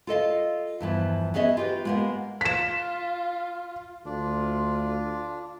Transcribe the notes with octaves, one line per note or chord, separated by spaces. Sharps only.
F4 A4 D#5 F5
E2 G2 E3 F3
B3 C#4 G#4 D#5 E5
F4 G4 B4
G#3 A#3 B3
F4 B6 E7
D2 D4 F4